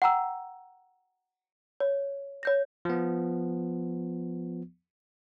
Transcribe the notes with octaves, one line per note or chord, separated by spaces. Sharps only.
F#5 G5 A#5 E6
C#5
C#5 G6 A#6
F3 B3